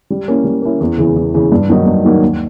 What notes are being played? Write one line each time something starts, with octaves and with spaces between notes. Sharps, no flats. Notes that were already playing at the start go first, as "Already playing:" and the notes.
G3
A#3 C#4 E4
G3
A#3 C#4 E4
E2
C#3 E3
E2
C#3 E3
G2
D#3 F#3 A#3 D#4
G2
D#3 F#3 A#3 D#4
D#2